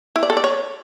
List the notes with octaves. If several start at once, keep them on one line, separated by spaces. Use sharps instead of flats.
E4
D5
A4
D5
C#5